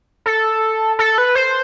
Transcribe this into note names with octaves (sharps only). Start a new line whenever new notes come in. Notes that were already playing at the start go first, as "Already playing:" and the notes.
A4
A4
B4
C5